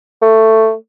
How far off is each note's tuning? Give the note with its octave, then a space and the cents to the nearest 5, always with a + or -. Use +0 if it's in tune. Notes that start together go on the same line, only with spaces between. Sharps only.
A3 +10